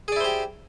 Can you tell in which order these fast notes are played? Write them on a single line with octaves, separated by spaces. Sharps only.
G#4 D5 E4 C5 G4